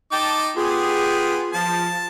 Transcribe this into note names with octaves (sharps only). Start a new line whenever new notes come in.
D#4 G5 A5 D6
B3 F4 G4 G#4
F3 A5